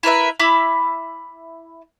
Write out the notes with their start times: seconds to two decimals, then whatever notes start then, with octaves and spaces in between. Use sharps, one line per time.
0.03 E4 A#4 B4 E5
0.39 E4 E5 B5 D6